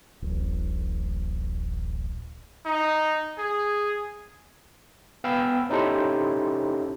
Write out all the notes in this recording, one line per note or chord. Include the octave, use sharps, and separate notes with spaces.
D1 A1
D#4
G#4
B3 F5 G5 G#5 B5 E6
C#4 D#4 E4 G4 A4 C5